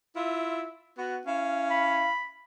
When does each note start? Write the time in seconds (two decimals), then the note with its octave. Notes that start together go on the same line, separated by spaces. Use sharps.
0.15 E4 F4 E5
0.98 B3 F#4
1.26 C#4 E4 F5
1.71 B5